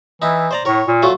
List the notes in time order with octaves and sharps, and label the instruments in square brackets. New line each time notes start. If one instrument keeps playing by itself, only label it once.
[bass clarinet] E3 [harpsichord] D#4 E4
[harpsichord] C5 D5 A#5
[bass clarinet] A2 [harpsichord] A#4 C#5
[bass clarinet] A#2
[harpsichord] F#3 A3 F4